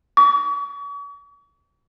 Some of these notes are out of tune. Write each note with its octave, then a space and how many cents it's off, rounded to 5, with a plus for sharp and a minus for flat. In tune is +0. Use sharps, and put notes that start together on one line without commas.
C#6 +45